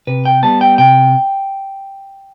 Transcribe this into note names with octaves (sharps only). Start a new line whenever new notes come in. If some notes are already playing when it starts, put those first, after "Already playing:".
C3 B4
G5
G3 B3 A5
G5
C3 G5